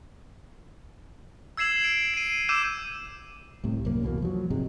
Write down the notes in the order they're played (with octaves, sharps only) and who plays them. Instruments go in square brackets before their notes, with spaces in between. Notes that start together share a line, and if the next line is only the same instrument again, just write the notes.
[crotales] E6 G#6 C7 E7 F#7
D7
C7 D#7
D6 E6 G6 D#7 E7
[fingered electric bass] C2 A2 C3
C2 F#2 A#3
E2 B2 F#3 A#3
F3 F#3
G#2 C3 G#3